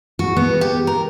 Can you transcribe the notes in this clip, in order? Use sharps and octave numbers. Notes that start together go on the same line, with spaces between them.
F#4
B3
G4
A#4